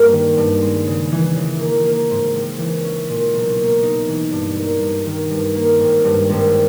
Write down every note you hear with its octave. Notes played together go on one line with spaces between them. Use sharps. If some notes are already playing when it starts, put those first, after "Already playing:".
Already playing: G2 G3 A#3
D#3
G2
G#3
C#3
E3
C#3
A#3
A#3
G#2
G#1
E3
C#4
A#2
B1
A#3
D#4
E3
G2
A#3
G2
D#3
G2
A#3
G#1
G2
G#1